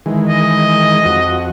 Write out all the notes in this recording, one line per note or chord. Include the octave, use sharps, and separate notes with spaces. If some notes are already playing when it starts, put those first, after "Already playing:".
D#3 E3 G#3
D#5
F2 F#4